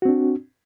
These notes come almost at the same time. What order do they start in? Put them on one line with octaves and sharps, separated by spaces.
F#4 C4 D4